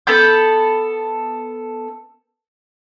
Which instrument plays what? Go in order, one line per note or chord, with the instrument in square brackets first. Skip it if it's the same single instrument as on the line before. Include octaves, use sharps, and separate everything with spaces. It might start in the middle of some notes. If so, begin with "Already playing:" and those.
[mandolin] B3 A4 B5 G6